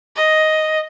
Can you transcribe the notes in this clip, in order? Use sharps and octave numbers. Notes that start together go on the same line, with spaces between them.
D#5